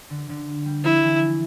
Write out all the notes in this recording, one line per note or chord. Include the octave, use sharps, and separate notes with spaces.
D3
D3
G3
F3 E4
E3